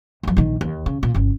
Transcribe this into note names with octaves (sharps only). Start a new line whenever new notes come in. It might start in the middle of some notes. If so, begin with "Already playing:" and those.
F#2 F3
A#1 D#3
D#2
C#3
A#2
G1 C#3